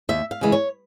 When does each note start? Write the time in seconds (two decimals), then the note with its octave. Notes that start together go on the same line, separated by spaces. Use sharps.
0.09 D#2 E5
0.31 F5
0.41 C#3 E3 G#3
0.52 C#5